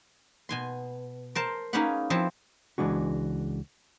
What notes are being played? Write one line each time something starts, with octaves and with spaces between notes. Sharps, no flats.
B2 G#5 C6
A#4 C5 A5
A#3 C#4 D#4 G#4 B4 F#5
F3 C4 E4 A5
C#2 E3 G#3 D4 F#4